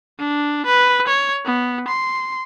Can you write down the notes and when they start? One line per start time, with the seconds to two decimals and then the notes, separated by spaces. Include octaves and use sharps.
0.19 D4
0.66 B4
1.08 C#5
1.46 B3
1.88 C6